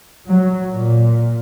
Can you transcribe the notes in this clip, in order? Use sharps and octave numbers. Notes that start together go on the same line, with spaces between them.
F#3
A#2